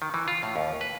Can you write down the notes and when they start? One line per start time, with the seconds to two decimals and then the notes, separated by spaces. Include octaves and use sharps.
0.02 D#3
0.14 E3
0.28 F4
0.43 A2
0.56 D#2
0.81 B4